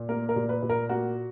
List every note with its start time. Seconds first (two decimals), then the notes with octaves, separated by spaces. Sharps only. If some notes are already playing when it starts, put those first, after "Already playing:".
Already playing: A#2
0.09 A#3 A#4
0.29 A#4
0.36 A#2
0.49 B4
0.63 A#2
0.70 A#4
0.89 A#3 F#4